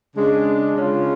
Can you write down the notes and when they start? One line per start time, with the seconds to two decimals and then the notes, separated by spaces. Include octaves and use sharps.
0.16 C#3 G#3 D4
0.74 C#3 G#3 C#4 F4